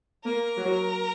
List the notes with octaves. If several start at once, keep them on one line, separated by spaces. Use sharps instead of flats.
A#3 A#4
F#3